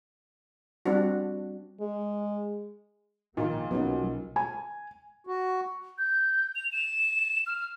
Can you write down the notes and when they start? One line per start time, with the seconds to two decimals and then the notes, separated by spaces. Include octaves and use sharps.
0.86 G3 C4 D4 F#4
1.81 G#3
3.37 A#1 A#2 D#3 A#3 D#4 F4 A#4
3.71 B1 B2 F#3 B3 C#4 D#4
4.36 G#5
5.27 F#4
5.98 G6
6.55 F7
6.72 E7
7.47 F6